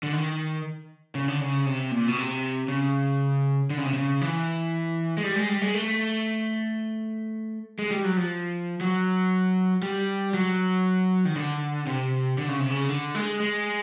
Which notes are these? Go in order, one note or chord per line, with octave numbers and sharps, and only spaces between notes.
D3
D#3
C#3
D3
C#3
C3
A#2
B2
C3
C#3
D3
C#3
C3
C#3
E3
G#3
G3
G#3
G3
G#3
A3
G#3
G3
F#3
F3
F#3
G3
F#3
D#3
D3
C3
D3
C#3
C3
C#3
D3
G#3
G#3